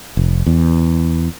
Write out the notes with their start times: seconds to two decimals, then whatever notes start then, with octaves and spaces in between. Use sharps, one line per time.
0.17 F1
0.46 E2